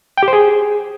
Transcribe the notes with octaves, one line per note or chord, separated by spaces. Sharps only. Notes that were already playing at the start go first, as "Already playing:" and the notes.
G5
G4
C5
G#4